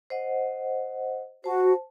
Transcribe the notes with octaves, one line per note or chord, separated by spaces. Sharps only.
C5 D#5 F#5
F#4 C5 A5